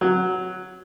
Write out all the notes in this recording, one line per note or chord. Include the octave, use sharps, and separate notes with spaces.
F#3